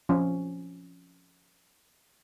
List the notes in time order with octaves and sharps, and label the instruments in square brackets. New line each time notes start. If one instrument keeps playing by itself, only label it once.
[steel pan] F3 C#4